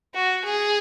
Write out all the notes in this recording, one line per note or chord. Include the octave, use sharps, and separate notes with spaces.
F#4
G#4